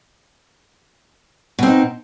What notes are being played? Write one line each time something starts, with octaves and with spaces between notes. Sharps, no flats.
B2 C4 D#4